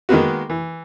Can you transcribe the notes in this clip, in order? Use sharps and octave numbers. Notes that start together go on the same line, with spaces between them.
D#3 G#3 A#3 B3 F#4
E3